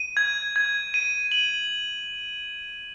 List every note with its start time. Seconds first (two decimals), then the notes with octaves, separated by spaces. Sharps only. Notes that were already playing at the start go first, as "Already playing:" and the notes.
Already playing: D#7
0.17 G#6
0.56 G#6
0.94 D#7
1.32 F#7